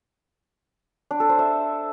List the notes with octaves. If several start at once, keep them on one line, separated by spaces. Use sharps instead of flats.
D4
A4
C5
E5